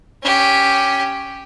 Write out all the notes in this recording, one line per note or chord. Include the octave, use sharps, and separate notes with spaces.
C#4 G4